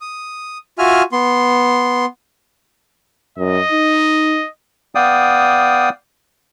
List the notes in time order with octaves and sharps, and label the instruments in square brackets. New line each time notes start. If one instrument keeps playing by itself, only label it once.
[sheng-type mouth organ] D#6
F4 F#4 E5 G#5 F6
B3 C6
[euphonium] F#2 [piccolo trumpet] D#5
[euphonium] D#4
[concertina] B3 D5 F5 G5 D#6